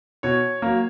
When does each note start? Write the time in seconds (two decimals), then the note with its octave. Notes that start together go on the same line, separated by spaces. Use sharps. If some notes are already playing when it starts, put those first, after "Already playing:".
0.23 B2 C#5
0.62 F#3 A#3